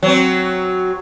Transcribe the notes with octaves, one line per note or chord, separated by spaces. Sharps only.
F#3 C4